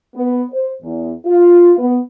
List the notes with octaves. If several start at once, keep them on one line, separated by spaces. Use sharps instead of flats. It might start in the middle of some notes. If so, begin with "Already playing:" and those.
B3
C5
E2
F4
B3